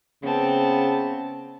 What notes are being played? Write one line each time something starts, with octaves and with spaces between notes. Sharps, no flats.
C#3 B3 C4 A5